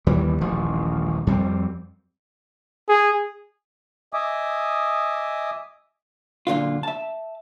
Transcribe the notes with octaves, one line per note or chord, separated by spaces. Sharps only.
D#2 E3 G3
D#1 A1 F3
F2 G3 C4
G#4
D#5 E5 G#5 D6 D#6
F#2 A#2 D3 F4
E5 A5